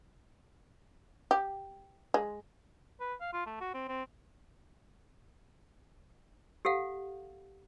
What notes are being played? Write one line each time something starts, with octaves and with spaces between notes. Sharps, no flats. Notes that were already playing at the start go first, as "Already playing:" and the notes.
G4
G#3
B4
F5
F4
A3
F#4
C4
C4
G4 A4 F5 F#5